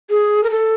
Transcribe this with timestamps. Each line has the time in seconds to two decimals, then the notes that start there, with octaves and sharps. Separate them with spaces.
0.10 G#4
0.44 A#4
0.50 A4